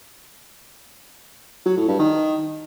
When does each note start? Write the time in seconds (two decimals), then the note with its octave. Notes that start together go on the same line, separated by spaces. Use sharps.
1.66 F#3
1.77 A2
1.88 G2
1.99 D#3